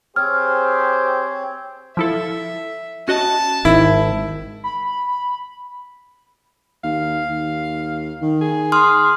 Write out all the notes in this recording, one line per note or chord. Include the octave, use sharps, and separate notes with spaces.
C4 G4 G#4 C5 C#5 F6
F3 E4 A4 E5
C#4 F#4 D#5 A5
G#1 G#2 D#3 E4
B5
D#2 F5
D#2
D#3
G#4
C6 D#6 F6